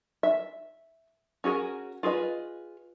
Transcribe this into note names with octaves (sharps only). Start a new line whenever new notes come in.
E5
C#4 F#4 G#4 A#4
F4 G#4 B4 D#5